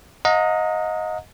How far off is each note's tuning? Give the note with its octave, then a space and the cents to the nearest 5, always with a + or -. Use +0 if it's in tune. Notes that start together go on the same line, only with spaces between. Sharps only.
D#5 +15 F#5 -45 A#5 -30